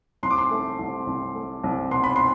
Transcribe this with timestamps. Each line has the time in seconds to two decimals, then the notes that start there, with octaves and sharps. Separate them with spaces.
0.23 C2 C6
0.30 D6
0.38 C6
0.51 A3
0.79 C2
1.07 C2
1.35 A3
1.64 C2
1.91 B2 C6
2.04 B5
2.16 C6